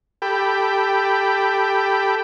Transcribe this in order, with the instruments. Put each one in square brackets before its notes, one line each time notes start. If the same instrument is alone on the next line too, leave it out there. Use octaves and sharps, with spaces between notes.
[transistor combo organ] G4 A4 G5 B5